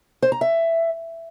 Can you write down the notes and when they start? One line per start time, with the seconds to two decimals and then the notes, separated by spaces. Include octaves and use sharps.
0.22 C5
0.32 A#5
0.41 E5